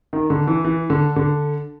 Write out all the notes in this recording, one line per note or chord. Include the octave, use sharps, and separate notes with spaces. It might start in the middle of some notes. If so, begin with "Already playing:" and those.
D#3
D3
E3
E3
D3
D3